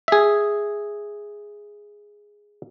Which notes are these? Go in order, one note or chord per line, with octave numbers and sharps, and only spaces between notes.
G#4 E5